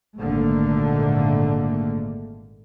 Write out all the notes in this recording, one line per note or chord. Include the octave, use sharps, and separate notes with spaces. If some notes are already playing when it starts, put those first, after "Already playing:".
G#1 A#2 D3 A3 A#3